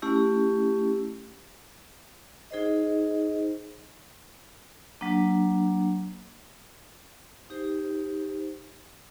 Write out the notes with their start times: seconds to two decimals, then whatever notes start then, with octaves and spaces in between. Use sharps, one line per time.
0.02 A3 C#4 E4 G4
2.51 D#4 G#4 C5 D#5
5.01 F#3 A#3 D4
7.50 D#4 G4 C5